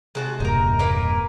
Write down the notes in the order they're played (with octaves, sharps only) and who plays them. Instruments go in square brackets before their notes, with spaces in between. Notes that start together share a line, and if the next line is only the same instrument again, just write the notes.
[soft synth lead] C3 [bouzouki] G#3 F#4 A5
[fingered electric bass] E1 G2 A#2 [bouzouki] D#4 A#4
[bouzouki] A#3 A#4 B4